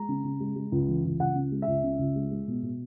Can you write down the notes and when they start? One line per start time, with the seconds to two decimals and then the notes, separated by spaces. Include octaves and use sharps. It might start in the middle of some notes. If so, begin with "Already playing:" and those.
Already playing: G#3 A#5
0.09 C#3
0.24 C#3
0.40 G#3
0.56 G#3
0.72 C#2
0.88 E3
1.05 C#2
1.20 C#2 F#5
1.35 C#3
1.52 G#3
1.62 E5
1.68 C#2
1.84 C#3
1.99 C#2
2.16 G#3
2.31 G#3
2.48 B2
2.63 B2